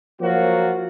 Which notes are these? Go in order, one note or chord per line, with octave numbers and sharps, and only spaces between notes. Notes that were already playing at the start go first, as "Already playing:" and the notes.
F3 F#3 A#3 F4 F#4